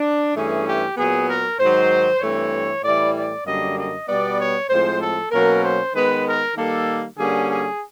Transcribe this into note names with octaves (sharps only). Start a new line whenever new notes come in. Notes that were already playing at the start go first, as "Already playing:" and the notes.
Already playing: D4
G2 E3 A3 C#4 G#4
G4
A#2 F#3 B3 G#4
A#4
G#2 D#3 F#3 C5
G2 E3 A3 C4 C#5
A2 E3 G3 D5
D5
F#2 D3 G3 A#3 D#5
D#5
B2 G3 B3 D5
C#5
A2 F3 G#3 C4 C5
A4
B2 F#3 A#3 C#4 A#4
C5
D#3 G#3 B3 B4
A#4
D#3 G3 A#3 A4
D3 G3 A#3 C#4 G#4
G#4